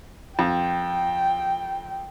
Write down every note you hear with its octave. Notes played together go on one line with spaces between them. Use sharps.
F2 G5